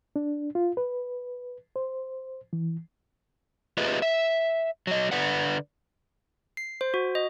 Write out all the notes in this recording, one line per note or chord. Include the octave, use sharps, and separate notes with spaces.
D4
F4
B4
C5
E3
F4 G4 G#4 B4 D#5 E5
E5
F#3 D#5
D3 B4 D5 F#5
C7
C5
F#4
D#5